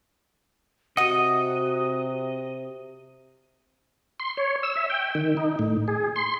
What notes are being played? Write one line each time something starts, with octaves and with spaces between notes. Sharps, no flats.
C3 F#4 D#5 F#5 D#7
C6
C#5
E6
E5
G5
D#3
D#4
A2
G#4
C6